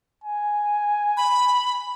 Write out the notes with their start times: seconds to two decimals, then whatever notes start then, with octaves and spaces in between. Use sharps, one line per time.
0.24 G#5
1.17 B5